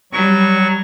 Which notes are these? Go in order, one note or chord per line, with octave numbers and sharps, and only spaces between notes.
F#3 G3 C#6